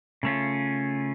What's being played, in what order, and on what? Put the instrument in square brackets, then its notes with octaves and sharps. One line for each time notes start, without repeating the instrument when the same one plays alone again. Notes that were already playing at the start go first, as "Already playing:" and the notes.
[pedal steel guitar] C#3 A3 C#4 F4